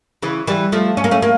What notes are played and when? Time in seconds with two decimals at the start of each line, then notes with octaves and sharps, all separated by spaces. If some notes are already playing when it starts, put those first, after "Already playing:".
0.22 C#3 E3
0.47 E3 G3
0.72 F3 A3
0.97 C#4
1.04 A#3
1.11 A3 C#4
1.22 A#3